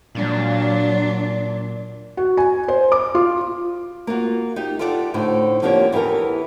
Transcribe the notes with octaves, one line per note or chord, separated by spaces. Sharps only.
A#2 F#3 D4
F#4
G#5
C5
D6
F4
A#3 F4 F#4
D#4 G4
F4 G4 A4 D5 E5 F#5
A2 D3 D#4 C5
D3 F3 A#3 D4 G4 C#5
E2 E3 G4 A4 A#4